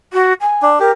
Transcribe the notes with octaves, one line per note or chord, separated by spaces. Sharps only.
F#4
G#5
D4
G4 A#4